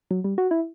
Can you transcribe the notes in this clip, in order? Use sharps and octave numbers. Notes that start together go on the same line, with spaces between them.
F#3
G3
F#4
E4